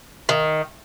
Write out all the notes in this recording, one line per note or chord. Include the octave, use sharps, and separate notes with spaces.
D#3